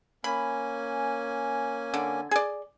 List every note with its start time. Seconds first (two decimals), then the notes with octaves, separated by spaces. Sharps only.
0.24 A#3 C#4 G#5 B5
1.94 D3
2.31 G#4 D5